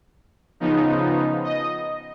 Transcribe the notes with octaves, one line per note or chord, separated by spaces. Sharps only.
C#3 F3 B3 D#4
D#5